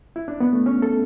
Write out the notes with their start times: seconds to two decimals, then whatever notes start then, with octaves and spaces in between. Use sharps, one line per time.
0.16 E4
0.28 D4
0.40 B3
0.53 A3
0.66 C#4
0.82 A4